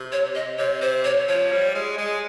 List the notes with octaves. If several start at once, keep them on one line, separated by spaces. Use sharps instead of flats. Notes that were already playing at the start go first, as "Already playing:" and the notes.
Already playing: C3
C#5
D#5
C3 C#5
C3 C5
C#5
F3 C#5
G3
G#3
G#3